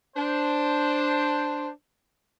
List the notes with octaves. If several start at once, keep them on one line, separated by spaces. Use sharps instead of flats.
D4 C5